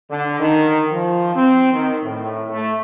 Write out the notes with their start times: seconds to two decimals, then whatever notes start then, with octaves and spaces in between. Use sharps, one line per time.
0.10 D3
0.40 D#3
0.91 F3
1.34 C4
1.73 D#3
2.03 A2
2.49 A3